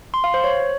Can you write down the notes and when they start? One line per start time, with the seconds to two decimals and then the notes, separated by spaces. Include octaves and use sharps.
0.14 C6
0.24 F5
0.34 C5
0.44 C#5